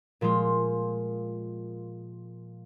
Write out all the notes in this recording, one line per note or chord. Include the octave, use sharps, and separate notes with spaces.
A#2 F3 G#3 F4